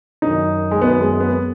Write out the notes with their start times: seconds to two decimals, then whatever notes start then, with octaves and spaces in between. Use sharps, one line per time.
0.22 F#2 D#3 F#3 D#4
0.71 G#3
0.81 F#2 D#3 F#3 B3
1.01 G#3
1.20 B3